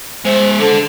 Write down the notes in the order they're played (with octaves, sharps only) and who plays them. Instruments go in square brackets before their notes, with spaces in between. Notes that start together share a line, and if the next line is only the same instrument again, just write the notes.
[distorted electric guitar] G#3 E5 [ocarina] C5
[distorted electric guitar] D3 [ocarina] A4